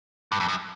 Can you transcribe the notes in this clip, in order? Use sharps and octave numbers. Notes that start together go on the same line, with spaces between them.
G2
F2
F#2